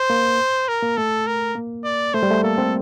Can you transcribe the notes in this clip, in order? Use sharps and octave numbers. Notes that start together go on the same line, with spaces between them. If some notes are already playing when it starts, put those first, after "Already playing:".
Already playing: C5
A#3
A#4
A#3
A3 A4
A#4
A#3
D5
A3 C5
G3
A3
A#3 A4
C4